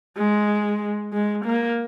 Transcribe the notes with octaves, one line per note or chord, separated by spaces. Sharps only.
G#3
G#3
A#3